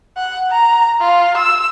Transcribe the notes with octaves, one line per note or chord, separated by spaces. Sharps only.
F#5
A#5
F4
E6